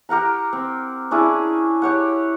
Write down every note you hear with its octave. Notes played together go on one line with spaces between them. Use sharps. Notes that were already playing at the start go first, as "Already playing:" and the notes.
G4 A#4 F#5 A#5
C4
C#4 D4 E4 G#4
G4 C#5 F#5